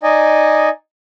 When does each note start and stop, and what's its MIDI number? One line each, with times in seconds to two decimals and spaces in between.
0.03 0.69 63
0.03 0.69 74
0.03 0.69 75
0.03 0.69 80